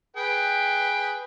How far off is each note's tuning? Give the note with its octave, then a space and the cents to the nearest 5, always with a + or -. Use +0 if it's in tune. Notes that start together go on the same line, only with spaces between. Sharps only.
G#4 +0 B4 +0 G5 +10